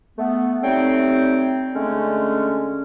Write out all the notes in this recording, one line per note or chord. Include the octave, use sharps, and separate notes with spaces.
A3 B3
G3 A3 C4 D#4 C#5 G5
D3 G#3 A3 C#4